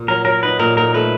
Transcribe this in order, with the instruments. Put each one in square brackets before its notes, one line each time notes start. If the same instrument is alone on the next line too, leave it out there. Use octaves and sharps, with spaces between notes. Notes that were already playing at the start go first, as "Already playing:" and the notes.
Already playing: [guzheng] A#2
[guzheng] F#3 [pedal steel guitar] A#4
[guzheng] F#3 [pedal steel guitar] A#4
[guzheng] D#4 [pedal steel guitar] B4
[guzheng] A#2 [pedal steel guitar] A#4
[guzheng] A#2 [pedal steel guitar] A#4
[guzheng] A3 [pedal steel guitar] B4